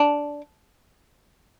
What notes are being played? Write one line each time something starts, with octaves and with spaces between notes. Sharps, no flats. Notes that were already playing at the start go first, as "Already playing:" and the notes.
Already playing: D4